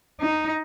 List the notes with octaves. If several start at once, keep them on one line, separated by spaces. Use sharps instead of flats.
D#4